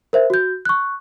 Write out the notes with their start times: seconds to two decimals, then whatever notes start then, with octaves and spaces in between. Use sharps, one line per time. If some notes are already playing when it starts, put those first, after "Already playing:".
0.13 A#4 C5 E5
0.30 F#4 G6
0.65 C#6 F#6